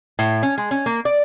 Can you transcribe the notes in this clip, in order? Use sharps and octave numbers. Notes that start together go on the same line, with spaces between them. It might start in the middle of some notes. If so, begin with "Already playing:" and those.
A2
C#4
G#3
C#4
A#3
D5